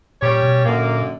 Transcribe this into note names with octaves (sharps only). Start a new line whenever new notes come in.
A#2 G3 C#4 G4 C#5
B2
F#2 A#2 D3 A#3